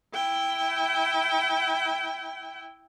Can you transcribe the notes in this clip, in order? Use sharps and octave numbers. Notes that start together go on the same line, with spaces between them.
E4 G5